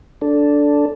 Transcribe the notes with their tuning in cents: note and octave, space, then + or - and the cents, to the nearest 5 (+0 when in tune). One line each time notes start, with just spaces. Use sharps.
D4 -10 A4 +0